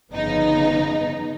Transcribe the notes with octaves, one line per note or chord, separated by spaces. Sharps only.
G1 F2 C#3 B3 D#4